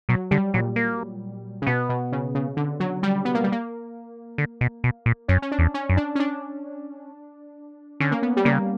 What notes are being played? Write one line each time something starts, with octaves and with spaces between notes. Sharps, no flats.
B2 F#3
D3 G3
A#2 F#3
A#3
C#3
B2 B3
B2
C#3
C#3
D3
F#3
G3
B3
A#3
G3
A#3
D3
B2
B2
A#2
F#2 C#4
C#4
D4
E2
C#4
F#2
D4
C#4
D4
D3 C#4
A#3
B3
G3
C#3 A#3